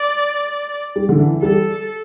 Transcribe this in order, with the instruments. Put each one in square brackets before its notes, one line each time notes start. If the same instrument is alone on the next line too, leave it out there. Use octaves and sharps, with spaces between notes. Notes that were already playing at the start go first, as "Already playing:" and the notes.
Already playing: [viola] D5
[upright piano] G3
D3
E3
[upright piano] G3 [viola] A4